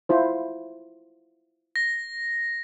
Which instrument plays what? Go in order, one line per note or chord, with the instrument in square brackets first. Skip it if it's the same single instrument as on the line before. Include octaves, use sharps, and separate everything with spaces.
[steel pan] E4 F4 C5
[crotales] A#6